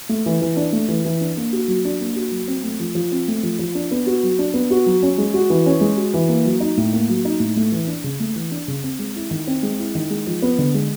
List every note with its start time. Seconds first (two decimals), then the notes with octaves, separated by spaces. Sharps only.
0.09 A3
0.26 E3
0.42 E3
0.57 D4
0.73 A3
0.88 E3
1.05 E3
1.21 D4
1.37 A#3
1.53 F#4
1.68 F#3
1.85 D4
2.01 A#3
2.16 F#4
2.31 F#3
2.48 C4
2.63 A3
2.80 F3
2.95 F3
3.12 C4
3.28 A3
3.43 F3
3.59 F3
3.75 D4
3.91 B3
4.07 F#4
4.23 F#3
4.39 D4
4.54 B3
4.71 F#4
4.86 F#3
5.03 C#4
5.18 G#3
5.34 F#4
5.50 E3
5.66 C#4
5.81 G#3
5.97 F#4
6.14 E3
6.29 A#3
6.45 F#3
6.60 D#4
6.77 A2
6.93 A#3
7.09 F#3
7.25 D#4
7.40 A2
7.57 A3
7.72 E3
7.87 D4
8.04 C#3
8.20 A3
8.36 E3
8.51 D4
8.68 C#3
8.84 C4
8.99 G#3
9.16 E4
9.31 D#3
9.47 C4
9.63 G#3
9.79 E4
9.95 D#3
10.10 G#3
10.27 F3
10.42 B3
10.58 D3
10.74 G#3